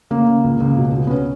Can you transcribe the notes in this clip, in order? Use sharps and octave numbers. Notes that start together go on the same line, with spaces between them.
C#3 A#3
C#3
C#2
C#2
B2
B2
B3
C#4